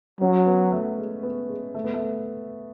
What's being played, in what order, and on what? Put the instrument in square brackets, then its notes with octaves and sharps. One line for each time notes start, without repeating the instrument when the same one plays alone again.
[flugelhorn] F#3 [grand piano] C#4
[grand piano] B3
A3
G#3
B3
G#3
A3
B3
A3